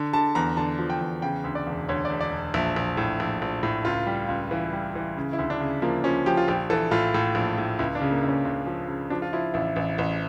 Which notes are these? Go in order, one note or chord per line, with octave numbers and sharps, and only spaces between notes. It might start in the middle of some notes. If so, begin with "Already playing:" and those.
Already playing: D3
D3 A5
E2 A#5
D3 A5
F3
G5
E2
C#3 G5
D2
D5
E1
D2 C#5
D5
E1
D5
E1
A#1 E5
A#1
A2
A#1
A#1
A2
C#2 F4
G3
C#2
E3
G3
E3
C#3
E4
D2
D4
C#3
F3 A#3
F3 C#4
F3 G4
F4
A#1 G4
E3 A4
A2 F4
A2
A#1
A2
C#2 E4
D4
C#3
A#3
C#2
C#4
C#2
F3
C#3
F3 D4
F4
F3 E4
A1 E4
A1
A1